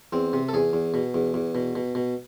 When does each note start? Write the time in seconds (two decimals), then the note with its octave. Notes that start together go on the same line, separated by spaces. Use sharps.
0.13 E2 C4
0.33 C3
0.49 A4
0.54 E2 G#4
0.73 E2
0.94 B2
1.14 E2
1.34 E2
1.55 B2
1.75 B2
1.95 B2